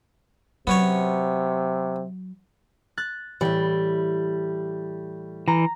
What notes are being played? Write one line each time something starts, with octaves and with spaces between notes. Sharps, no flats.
C3 F#3 B3 C#4 C#5
F#6 A6
A2 E3 G3
E3 A#5